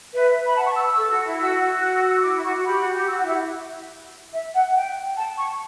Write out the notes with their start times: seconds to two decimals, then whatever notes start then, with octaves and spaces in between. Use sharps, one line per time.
0.14 B4 E5
0.46 B5
0.56 F#5 A5
0.66 C#6
0.69 A5
0.76 E6
0.87 E6
0.98 A4
1.11 F#4
1.26 E4
1.39 F#4 E6
1.82 F#6
1.95 E6
2.10 E6
2.23 E4 D6
2.35 E4
2.44 F#4 C#6
2.55 F#4
2.66 G4 B5
2.79 F#4
2.93 G4
3.00 D6
3.08 F#4 E6
3.18 F#5
3.22 E4
3.28 E5
4.33 E5
4.55 F#5
4.75 G5
5.17 A5
5.38 C#6